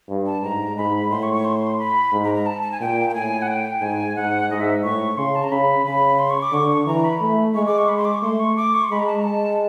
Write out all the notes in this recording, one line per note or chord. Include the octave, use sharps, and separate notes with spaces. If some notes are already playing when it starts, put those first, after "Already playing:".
G2
A5
G#2 A#5
G#2 B5
A2 C6
C#6
C#6
C6
B5
G#2
A#5
A#5
A5
A5
G#5
A#2 G5
G5
A2 G#5
F#5
G5
G#2 G#5
G#2 F#5
G#2 D#5
E5
A2 C#6
C#3 C6
A5
A#5
C#3 B5
C#3 B5
C6
C#6
D6
D3 C#6
E3 A#5
B5
A3
G#3 C#6
D6
C#6
B5
C6
D6
C#6
A3 C6
C#6
D6
C#6
C6
G#3 B5
A#5
A5
A#5
G#3 A5